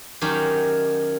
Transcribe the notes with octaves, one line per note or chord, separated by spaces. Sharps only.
D#3 F#3 C#4 G4